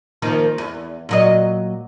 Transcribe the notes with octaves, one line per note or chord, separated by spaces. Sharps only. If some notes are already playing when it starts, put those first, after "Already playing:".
D#3 F3 A#3
E2
A#2 F#3 D#5